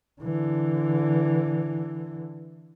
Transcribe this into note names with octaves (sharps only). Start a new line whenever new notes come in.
D3 E3